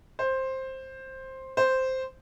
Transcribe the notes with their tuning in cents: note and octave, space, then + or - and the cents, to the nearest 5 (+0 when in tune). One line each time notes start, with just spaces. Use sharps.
C5 +10
C5 -5